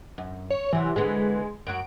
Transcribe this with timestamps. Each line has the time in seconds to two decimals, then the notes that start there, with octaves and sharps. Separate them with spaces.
0.18 F#2
0.50 C#5
0.73 C3 E3 F#3
0.96 D3 E3 G#3 B3
1.67 F#2 F#3 F#4 D7